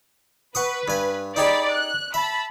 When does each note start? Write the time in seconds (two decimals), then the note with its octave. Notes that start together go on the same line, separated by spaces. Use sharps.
0.55 B4 F#5 C#6 D#6
0.88 G2 G#5
1.36 D#4 G4 G#4 D5 B5
1.71 F#6
2.14 E5 A5 B5